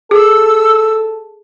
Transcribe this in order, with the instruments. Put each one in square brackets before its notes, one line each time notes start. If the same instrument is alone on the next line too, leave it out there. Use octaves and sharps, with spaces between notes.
[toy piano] G#4 [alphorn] A4 [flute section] E6